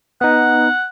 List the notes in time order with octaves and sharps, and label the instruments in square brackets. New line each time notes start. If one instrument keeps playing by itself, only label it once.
[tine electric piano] B3 D#4 [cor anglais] F#5